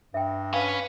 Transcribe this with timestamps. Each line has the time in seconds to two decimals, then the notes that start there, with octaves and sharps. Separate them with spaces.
0.14 G2 E5 G5
0.54 C#4 B4 F5